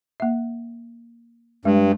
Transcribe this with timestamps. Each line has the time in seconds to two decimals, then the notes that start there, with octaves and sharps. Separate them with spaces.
0.20 A#3 E5
1.65 G2 G#3